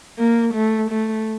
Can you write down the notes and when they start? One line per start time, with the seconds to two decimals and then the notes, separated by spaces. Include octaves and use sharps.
0.19 A#3
0.54 A3
0.90 A3